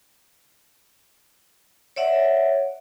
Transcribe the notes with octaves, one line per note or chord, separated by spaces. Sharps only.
C#5 D5 E5 F#5